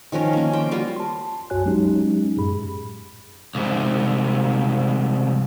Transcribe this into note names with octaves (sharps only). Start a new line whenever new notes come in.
D#3 F3 C#4 A#4
A#3 C#4
C5 G5
G3 A#3 F4 F#4
A5 C6
C2 F#2 F#4 C#5 G#5 F#6
F#3 G#3 C#4 D#4 G4
F#2 A2 G#4 B5
C2 G#2